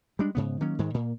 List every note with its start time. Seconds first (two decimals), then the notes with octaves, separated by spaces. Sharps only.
0.19 G3 G#3 D4
0.35 G#2 C#3 B3
0.61 D#3 F#3 A#3 C#4
0.79 G#2 D#3 G#3
0.94 A#2 A#3